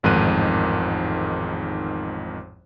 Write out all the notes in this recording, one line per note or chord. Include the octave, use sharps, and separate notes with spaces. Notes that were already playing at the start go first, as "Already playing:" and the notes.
A1 F2 G#2 D#3 F#6 D#7